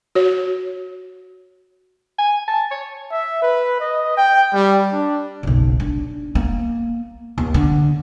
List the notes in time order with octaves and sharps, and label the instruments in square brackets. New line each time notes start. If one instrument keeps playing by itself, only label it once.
[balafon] F#4 C#5
[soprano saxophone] G#5
A5
C#5
[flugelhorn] E5
B4
D#5
G5
G3
D4
[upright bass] F#1 B1
D4
A#3
D#2
D3